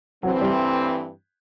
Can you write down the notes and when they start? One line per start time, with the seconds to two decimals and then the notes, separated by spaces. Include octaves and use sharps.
0.23 G2 E3 F#3 A3 C4
0.41 G3